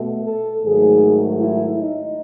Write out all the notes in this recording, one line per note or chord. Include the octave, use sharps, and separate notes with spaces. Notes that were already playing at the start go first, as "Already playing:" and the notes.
Already playing: B2 A3
A4
G#2 D#3 F#3 A3 G#4
E4
D#4